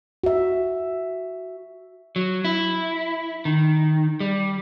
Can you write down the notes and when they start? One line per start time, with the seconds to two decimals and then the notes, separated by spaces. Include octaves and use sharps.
0.23 F#4 E5
2.16 F#3
2.45 E4
3.45 D#3
4.20 G3